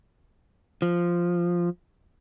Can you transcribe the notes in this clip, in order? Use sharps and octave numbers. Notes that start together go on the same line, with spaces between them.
F3